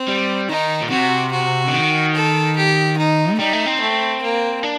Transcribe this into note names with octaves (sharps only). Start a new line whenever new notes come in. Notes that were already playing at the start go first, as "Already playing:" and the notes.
Already playing: C4
G3
D#3 D#4
A#2
C3 F#4
F#4
D3
D#3
A4
G4
D#4
A3
G3 D#4
A3
C4
A3
A#3
D4